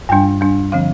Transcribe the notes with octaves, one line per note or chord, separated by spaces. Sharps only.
G2 G3 D4 G5
G2 G3 D4
D3 F3 C4 F5